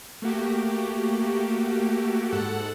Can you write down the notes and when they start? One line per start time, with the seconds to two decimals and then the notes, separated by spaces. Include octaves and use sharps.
0.22 A3 A#3 F#4 G4
2.32 G#2 A4 F#5